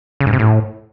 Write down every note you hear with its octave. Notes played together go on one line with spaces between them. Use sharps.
C#3
G#2
C3
A2